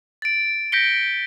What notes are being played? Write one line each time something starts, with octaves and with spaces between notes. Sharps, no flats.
A6 D7
G6 A#6 B6 C#7 D7 G7